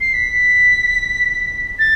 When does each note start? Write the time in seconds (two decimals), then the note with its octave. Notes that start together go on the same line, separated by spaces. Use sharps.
0.01 C7
0.14 B6
1.79 A6